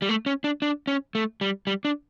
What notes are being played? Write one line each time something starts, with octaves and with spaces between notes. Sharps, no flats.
G3
A3
C#4
D4
D4
C#4
A3
G3
G3
D4